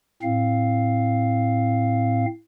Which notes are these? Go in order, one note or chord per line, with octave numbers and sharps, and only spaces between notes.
A2 C4 F5